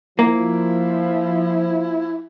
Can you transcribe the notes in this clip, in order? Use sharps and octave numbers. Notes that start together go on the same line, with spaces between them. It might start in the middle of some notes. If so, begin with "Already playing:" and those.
F3 A#3 E4